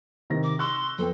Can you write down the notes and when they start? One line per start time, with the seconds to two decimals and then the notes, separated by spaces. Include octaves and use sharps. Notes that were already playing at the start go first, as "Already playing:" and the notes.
0.30 C3 D#3 A#6
0.43 D6
0.59 C6 C#6 E6 F#6
0.98 F2 B3 A4 G5